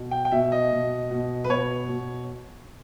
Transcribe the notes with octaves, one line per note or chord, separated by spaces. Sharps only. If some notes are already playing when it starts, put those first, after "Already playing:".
Already playing: B2
G5
G5
B2 E5
D#5
B2
B2
B4
B2 C#5
B2